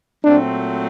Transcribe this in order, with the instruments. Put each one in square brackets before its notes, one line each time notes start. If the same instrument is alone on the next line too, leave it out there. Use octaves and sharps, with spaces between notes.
[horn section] A#2 F#3 A3 C4 [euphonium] D4